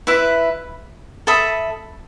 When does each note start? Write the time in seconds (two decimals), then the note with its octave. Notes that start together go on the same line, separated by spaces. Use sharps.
0.07 E4 B4 E5
1.27 A4 E5 B5 D#6